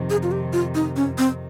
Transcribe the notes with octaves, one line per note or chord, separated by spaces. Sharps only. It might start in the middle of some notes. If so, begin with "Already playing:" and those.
Already playing: F2 C3 D#3
G#4
F4
G4
F4
D#4
C#4
C4